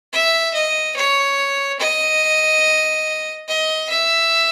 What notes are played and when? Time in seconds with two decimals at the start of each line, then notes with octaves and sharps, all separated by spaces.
0.13 E5
0.54 D#5
0.96 C#5
1.79 D#5
3.48 D#5
3.89 E5